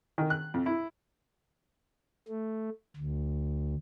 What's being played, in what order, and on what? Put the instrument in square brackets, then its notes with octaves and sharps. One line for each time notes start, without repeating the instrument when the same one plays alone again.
[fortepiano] D#3
F#6
F2
E4
[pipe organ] A3
D2